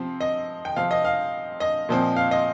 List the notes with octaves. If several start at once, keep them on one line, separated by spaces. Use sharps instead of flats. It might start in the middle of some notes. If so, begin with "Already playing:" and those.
Already playing: C3 F3 C4
D#5
G5
C3 F3 C4 F5
D#5
F5
D#5
A#2 F3 C4
F5
D#5